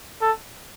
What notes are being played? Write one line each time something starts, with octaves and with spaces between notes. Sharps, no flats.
A4